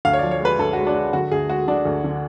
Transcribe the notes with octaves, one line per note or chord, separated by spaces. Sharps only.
D2 F5
C#5
F3 D5
C#5
G#3 B4
D2 A4
F#4
G#3
D4
G#3
D3 F#4
D2 G#4
G#3 F#4
D3 D4
D2
D3